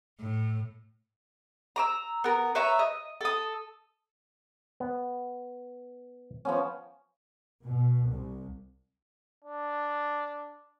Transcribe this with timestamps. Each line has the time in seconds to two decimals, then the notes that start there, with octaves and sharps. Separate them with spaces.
0.19 A2
1.76 A#5 D6 E6
2.24 B3 A#4
2.55 B4 C#5 E5 A#5
2.79 D#5
3.21 A4 D#6
4.80 B3
6.45 F3 B3 C#4
7.64 B2
8.07 C2
9.45 D4